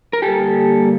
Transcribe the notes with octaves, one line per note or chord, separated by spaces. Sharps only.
A#4
D3 G3 A#3 G4 A4